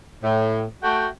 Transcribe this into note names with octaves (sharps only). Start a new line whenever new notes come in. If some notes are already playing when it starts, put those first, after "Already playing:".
A2
A3 F#4 G5